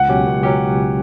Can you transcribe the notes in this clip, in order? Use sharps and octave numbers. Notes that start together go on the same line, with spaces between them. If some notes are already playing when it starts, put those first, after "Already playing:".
Already playing: C#2 F#5
B2 F#3 C#4 G4
C#2
F#3 C#4 G4